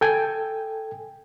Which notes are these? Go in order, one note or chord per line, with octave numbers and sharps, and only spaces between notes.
A4 G5 G#5